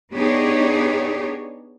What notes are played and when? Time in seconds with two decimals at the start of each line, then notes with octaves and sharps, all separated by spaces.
0.13 B3 D4 D#4 G4 G#4 C#5